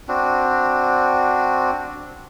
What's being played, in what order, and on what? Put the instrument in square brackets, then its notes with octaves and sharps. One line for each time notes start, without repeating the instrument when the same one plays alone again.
[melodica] C4 D4 F#4